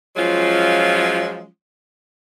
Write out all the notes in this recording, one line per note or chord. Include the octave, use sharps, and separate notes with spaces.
F3 F#3 G#3 C#4 F4